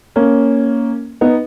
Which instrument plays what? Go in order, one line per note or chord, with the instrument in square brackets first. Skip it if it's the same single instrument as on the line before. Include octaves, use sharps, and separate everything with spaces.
[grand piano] A#3 C#4
B3 D#4